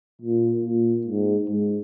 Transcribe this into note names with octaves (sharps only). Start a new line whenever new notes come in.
A#2
A#2
G#2
G#2